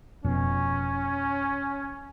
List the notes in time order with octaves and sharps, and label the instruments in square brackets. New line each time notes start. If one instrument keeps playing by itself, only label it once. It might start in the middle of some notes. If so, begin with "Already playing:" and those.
[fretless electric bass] F1 F2 B2 [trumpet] C#4